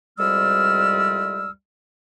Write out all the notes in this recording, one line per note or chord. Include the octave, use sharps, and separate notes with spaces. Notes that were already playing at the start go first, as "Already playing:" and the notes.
C2 F2 G3 G#3 E6 F6